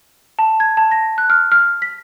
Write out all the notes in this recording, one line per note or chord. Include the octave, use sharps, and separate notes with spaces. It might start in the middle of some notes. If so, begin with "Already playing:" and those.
A5
G#6
A5
A#6
F#6
F6
F6
B6